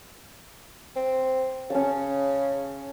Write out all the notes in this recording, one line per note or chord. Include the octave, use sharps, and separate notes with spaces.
C4
C#3 C#4 A5